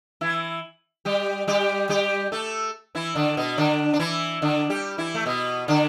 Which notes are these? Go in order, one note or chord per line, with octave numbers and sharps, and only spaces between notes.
E3 E4
G3 G4
G3 G4
G3 G4
A3 A4
E3 E4
D3 D4
B2 B3
D3 D4
D4
E3 E4
D3 D4
G3 G4
E3 E4
A3
B2 B3
D3 D4